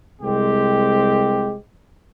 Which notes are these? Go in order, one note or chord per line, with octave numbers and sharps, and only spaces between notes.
C2 G#3 C4 G4